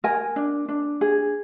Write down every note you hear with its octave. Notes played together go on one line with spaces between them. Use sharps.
A#4 G#5
D4
D4
G#4